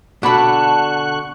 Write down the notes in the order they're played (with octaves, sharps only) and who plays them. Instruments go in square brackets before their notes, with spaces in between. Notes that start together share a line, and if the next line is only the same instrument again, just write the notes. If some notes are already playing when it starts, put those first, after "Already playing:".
[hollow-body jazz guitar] B2 D3 [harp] D5 B5 [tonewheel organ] F#5 C#6 F#6 [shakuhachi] A5